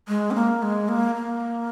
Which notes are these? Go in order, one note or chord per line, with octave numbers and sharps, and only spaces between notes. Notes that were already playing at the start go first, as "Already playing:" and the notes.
G#3
C#4
A#3
G#3
A#3
A#3